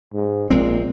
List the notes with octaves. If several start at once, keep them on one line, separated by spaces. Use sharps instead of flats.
G#2
A#1 A#2 G#3 C4